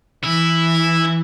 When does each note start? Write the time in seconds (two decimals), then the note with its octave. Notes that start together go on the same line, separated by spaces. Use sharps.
0.24 E3 E4